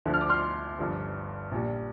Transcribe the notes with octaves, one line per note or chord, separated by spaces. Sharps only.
D2 D3 F3
F6
D6
C6 F6
G1 G2 D3 F3
A#1 A#2 G3